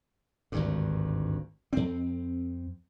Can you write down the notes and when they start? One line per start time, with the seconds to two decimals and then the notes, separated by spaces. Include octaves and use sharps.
0.52 G#1 D2 G2
1.73 F2 C4